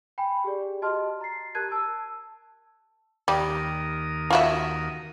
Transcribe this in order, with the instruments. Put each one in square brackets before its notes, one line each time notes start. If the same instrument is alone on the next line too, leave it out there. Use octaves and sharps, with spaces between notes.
[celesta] G5 G#5 B5
G4 G#4 D5
F#4 G4 D#5 A5 C6 F6
A#5 A6 C7
G4 A#4 A5 F#6 G#6 D#7
A5 E6
[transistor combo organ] D#2 A#4 D#6 [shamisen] G3
[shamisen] F4 F#4 E5